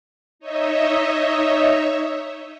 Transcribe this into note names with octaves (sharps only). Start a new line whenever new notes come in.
D#4 C#5 D#5 E5